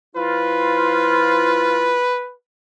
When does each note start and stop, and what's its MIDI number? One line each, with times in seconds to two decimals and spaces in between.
0.16 1.99 53
0.16 1.99 64
0.16 1.99 65
0.16 2.34 71